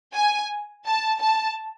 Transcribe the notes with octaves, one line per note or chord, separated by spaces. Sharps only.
G#5
A5
A5